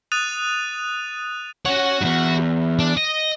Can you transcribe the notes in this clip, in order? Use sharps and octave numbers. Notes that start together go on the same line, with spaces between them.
D#6 F#6 A6 D#7 F7
C#4 F#4 C#5 F#5
E2 G2
D4
D#5